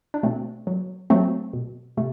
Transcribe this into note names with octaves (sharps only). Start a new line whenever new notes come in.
D4
B2 A3 C4
F#3
F#3 A3 C4
B2
C3 A3